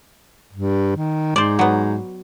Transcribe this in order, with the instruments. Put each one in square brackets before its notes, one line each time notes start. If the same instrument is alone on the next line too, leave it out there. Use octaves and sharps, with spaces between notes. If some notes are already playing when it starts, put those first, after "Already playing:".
[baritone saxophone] G2
D#3
[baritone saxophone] G#2 [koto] C5 D5
[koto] F#3 B3